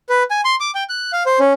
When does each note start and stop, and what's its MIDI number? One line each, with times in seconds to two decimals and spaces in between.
0.09 0.23 71
0.31 0.41 80
0.45 0.55 84
0.60 0.71 86
0.75 0.84 79
0.89 1.11 90
1.13 1.23 77
1.26 1.39 72
1.40 1.53 61